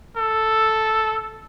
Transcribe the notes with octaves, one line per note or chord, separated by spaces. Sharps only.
A4